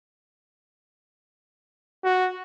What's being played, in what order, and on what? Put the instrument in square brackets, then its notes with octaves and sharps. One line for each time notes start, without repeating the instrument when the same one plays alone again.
[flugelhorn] F#4